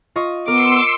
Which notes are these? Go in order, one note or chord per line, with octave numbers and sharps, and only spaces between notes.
F4 D#5 C#6
B3 A#4 C6 D6 E6 C#7